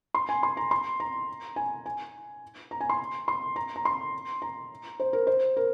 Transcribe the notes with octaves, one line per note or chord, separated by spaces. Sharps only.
C6
G#5
C6
A#5
C6
A#5
G#5
G#5
A#5
G#5
C6
C6
A#5
A#5
C6
A#5
C5
A#4
C5
A#4